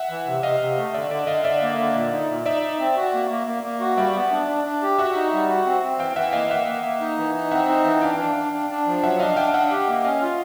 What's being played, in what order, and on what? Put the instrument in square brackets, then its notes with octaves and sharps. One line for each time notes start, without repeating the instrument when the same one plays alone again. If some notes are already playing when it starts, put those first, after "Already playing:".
Already playing: [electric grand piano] E5 F#5
[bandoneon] E3
C3
[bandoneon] C3 [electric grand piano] D#5 F5
[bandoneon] C3
A3
[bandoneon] D3 [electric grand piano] D5 E5
[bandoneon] D3 [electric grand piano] D5 E5
[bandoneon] D3 [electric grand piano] D#5 F5
[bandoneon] D3 [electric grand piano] D5 E5
[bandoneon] A#3
D3
A#2
D#4
A#2
[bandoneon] D#4 [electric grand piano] D5 E5
[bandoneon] D#4
C4
F#4
A#3
A#3
A#3
A#3
F#4
[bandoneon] G3 [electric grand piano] D5 E5
[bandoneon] B3
D4
D4
D4
G4
[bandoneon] F#4 [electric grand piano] E5 F#5
[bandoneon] D#4
G3
F#4
C4
C4
[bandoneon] E3 [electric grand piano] F5 G5
[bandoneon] E3 [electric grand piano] E5 F#5
[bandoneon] A#3 [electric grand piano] D#5 F5
[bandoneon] A#3 [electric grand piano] E5 F#5
[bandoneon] A#3
A#3
D#4
E3
D#4
[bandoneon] C4 [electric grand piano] E5 F#5
[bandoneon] D#4
E3
[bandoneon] D4 [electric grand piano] F5 G5
[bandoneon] D4
D4
D4
D4
F3
[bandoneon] F#3 [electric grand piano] E5 F#5
[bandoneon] D4 [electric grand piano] D#5 F5
[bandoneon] D4 [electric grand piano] F5 G5
[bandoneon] D4 [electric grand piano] E5 F#5
[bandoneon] G4
A#3
[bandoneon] C#4 [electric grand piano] D#5 F5
[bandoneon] F4